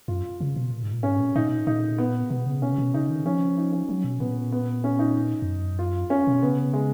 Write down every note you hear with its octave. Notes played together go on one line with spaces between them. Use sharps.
F#2 F4
C#3
B2
A#2
G#2
A#2
G#2 C#4
A#2
A#2 D#4
B2
A#2
A#2 D#4
B3
B2 B3
C#3
B2 C#4
C#3
B2
C#3 D#4
D#3
F3 C#4
D#4
C#4
F#3
B2
A#2 B3
B3
C#4
D#4
F2
F#2
F4
C#4
B2
C#3 B3
G#3